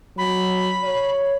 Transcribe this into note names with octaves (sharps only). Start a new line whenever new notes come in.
F#3 B5
C#5